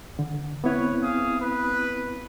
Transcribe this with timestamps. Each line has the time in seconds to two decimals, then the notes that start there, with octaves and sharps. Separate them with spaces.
0.19 D3
0.64 B3 C4 E4 B4 C#5
1.02 G#4 F5 D#6
1.41 B4